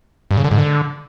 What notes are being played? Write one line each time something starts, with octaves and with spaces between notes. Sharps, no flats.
G2
C#3
D3
G#2
D3